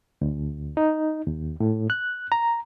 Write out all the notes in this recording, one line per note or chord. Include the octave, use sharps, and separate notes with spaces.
D2
D#4
D#2
A2
F#6
A#5